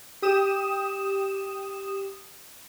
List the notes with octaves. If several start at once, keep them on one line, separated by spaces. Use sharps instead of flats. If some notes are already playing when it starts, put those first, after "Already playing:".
G4 D#6 E7